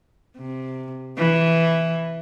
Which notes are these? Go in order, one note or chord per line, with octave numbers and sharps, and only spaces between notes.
C3
E3